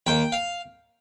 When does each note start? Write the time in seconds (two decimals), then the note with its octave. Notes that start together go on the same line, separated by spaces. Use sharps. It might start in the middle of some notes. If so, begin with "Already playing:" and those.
0.06 D#2 G5
0.32 F5